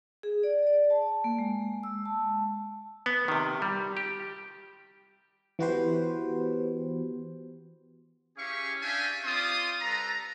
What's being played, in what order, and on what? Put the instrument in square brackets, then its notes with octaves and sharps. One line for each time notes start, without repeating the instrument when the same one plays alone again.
[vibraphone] G#4
D5
D5
A5
A#3
G#3
E6
A5
[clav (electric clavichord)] B3
C3 D#3
G3
G4
[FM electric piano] E3 B3 F#4 G4 B4 C5
[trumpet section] C#4 E4 G4 G#4 F5 C#6
D4 G4 E5 F5 G5 G#5
C4 F4 D5 F5 C6 D#6
G3 A4 B4 A#5